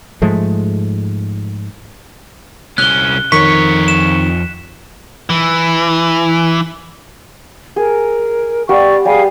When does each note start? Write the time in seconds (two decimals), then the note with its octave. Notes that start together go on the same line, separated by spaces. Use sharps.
0.22 G#2 F3 G#3 A3
2.78 C2 C#4 F#6 G7
3.32 F2 D#3 C#5 C#6 B6 C#7
3.88 E7
5.30 E3
7.76 G#4 A#4
8.69 B3 G4 D5 F5 G5 C#6
9.05 G3 G#4 F5 G#5